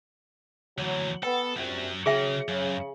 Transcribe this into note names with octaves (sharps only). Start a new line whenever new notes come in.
D2 E3 F#3
B3 A4 G5
A#1 F#2 C3 F#3
C#3 F#3 G#4 E5 G5
F#2 C#3